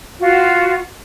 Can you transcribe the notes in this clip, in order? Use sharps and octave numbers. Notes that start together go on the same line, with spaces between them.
F4 F#4